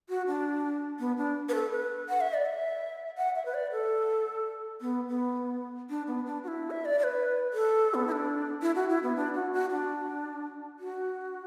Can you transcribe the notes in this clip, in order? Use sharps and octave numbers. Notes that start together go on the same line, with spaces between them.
F#4
D4
B3
D4
B4
A4
B4
F#5
E5
D5
E5
F#5
E5
B4
D5
A4
B3
B3
D4
B3
D4
F#4
E4
E5
D5
D5
B4
A4
B3
E4
D4
E4
F#4
E4
B3
D4
F#4
F#4
D4
F#4